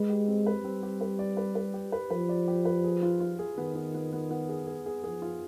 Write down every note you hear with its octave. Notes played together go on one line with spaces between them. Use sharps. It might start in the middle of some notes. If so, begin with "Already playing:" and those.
Already playing: G#3 B4
G4
C4
B4
G3 C4
G4
B4
D5
B4
B4
G4
B4
F3 B4
D5
G4
B4
G#4
F4
F4
G#4
D#3 B3
B3
B3
B3
B3
G#4
G#4
G#4
F3 G#4
F4